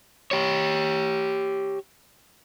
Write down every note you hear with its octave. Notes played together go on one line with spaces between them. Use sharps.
G4 C#5